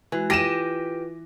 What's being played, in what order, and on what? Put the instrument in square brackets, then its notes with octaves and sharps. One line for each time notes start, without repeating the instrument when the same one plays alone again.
[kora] E3 [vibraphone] G#3 F#4
[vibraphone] F4 B4 [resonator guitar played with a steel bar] G4 [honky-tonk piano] A#6 D#7 E7